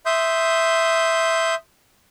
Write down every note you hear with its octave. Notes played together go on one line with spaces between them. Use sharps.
E5 C6 D#6 G6